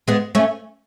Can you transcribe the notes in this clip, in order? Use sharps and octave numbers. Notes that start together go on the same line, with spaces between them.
G#3 B3
A3 C#4